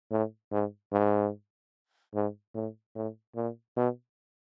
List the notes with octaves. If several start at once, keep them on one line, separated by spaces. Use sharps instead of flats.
A2
G#2
G#2
G#2
A2
A2
A#2
B2